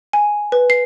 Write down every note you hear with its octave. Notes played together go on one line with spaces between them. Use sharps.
G#5
B4
C7